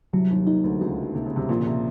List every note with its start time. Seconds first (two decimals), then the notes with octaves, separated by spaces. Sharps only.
0.13 C2 C3 F#3
0.30 D#2 D#3
0.47 D#2 D#3 D#4
0.64 D2 D3
0.81 C#2 C#3 F#4
1.15 C3 A#3
1.26 C#3
1.36 C2 C3
1.49 A#1 A#2 A#3
1.60 C#3
1.67 C3